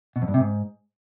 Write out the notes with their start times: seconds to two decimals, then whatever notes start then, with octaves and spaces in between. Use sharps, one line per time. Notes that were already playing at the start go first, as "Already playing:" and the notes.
0.16 B2
0.22 F2
0.28 G2
0.34 C3
0.40 G#2